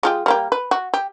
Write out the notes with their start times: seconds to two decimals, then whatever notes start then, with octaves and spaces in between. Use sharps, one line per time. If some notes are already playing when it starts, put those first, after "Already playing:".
0.03 G#3 F4 G4
0.26 G3 A#3 G4
0.52 B4
0.71 F#4
0.94 G4